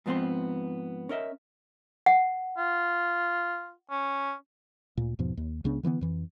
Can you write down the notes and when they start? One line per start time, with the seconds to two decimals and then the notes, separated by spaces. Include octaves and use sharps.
0.06 G#2 F3 B3 C4 B4 C6
1.09 C#4 A#4 D#5 E5
2.06 F#5
2.58 F4
3.90 C#4
4.97 D2 A#2
5.19 E2 G#2 B2 F3
5.37 D#2
5.64 C#2 C#3 B3 D4
5.83 D3 E3 A3 B3
6.01 F2 E3